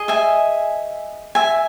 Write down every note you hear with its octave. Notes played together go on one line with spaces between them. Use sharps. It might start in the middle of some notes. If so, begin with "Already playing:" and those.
Already playing: G#4 D#5
E5 G#5
E5 G#5